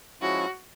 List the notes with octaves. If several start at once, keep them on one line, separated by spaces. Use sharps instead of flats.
F3 G#3 C#4 E4 F#4